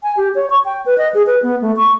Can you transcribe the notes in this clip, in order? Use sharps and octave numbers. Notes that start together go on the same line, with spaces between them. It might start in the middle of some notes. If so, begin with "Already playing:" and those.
G#5
G4
C#5
C#6
G5
B4
D#5
G#4
B4
B3
A3
C#6